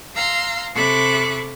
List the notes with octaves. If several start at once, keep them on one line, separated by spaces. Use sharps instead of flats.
F5 A#5 C6 E6
C3 A4 B5 C#6 D6 F#6